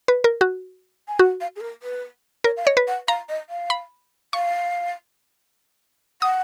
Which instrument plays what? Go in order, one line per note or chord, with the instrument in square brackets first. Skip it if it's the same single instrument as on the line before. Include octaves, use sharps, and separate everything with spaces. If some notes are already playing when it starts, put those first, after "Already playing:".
[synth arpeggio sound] B4
A#4
F#4
[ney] G#5
[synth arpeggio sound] F#4 [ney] F#5
[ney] F5
G#4
A#4
B4
[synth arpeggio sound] A#4 [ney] C#5
[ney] F5
[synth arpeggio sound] C#5 [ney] D#5
[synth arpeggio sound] B4
[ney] F#5
[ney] F5 [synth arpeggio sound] A#5
[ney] D#5
F5
[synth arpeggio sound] B5
[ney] F5 [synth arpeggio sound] C#6
[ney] F#5 [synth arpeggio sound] D#6